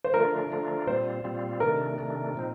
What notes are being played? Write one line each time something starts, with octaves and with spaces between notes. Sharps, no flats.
C5
D3 F3 A3 D4 F4 A#4
D3 F3 A3 D4 F4
A#2 G3 C4 F4 C5
A#2 G3 C4 F4
C3 D#3 A3 D4 A#4
C3 D#3 A3 D4
A#2 F3 C4 D#4